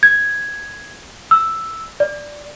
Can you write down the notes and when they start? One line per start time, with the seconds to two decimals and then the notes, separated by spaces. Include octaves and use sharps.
0.03 G#6
1.31 E6
2.00 D5